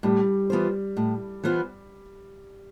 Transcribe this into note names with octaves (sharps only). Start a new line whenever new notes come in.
A2 G3
E3 B3 F4 C5
A2
E3 B3 F4 C5